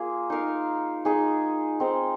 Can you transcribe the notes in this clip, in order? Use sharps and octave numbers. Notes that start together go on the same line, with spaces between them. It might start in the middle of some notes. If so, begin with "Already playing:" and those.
Already playing: A#3 F4 G#4
D#4 A#4 F5
G#3 D#4 G#4
G#3 C4 D#4 A#4